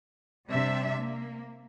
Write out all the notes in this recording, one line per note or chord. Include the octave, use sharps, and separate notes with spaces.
C3 G3 D4 E5
A#3